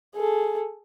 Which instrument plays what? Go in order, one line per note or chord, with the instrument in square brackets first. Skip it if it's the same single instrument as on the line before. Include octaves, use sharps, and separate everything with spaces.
[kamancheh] G#4 A4